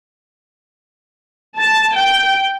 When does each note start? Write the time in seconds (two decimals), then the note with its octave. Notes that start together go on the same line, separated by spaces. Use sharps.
1.57 A5
1.95 G5